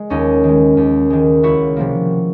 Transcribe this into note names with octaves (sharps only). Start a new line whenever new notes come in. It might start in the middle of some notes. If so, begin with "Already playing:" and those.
Already playing: G#3
D#2 C#4 D#4
D#3
G#3
D#2
D#3 G#3
C#2 E4 F#4
C3 F3 A#3